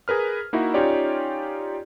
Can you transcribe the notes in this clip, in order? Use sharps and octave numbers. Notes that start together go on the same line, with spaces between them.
G#4 A#4 B4 F6
A#3 D#4 E4 F#4
C#4 D#4 F4 G4 C#5 D5